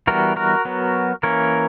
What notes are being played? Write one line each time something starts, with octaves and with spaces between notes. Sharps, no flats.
E3 G3 B3 F#4 A#4
F#4 A#4
F#3 B3
E3 A#3 C#4 A#4 C#5